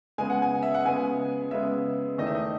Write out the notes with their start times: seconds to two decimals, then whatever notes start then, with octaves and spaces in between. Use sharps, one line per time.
0.18 C#3 G#3 B3 G#5
0.30 F#5
0.42 G#5
0.63 E5
0.74 F#5
0.85 C#3 G#3 B3 G#5
1.51 C#3 G#3 B3 E5
2.18 E2 D#3 A3 D#5
2.27 E5
2.35 D#5